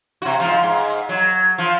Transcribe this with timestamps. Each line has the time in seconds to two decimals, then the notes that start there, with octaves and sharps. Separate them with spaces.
0.22 C3 F#4
0.40 G#2 F3
0.63 G#2
1.09 F#3
1.58 F3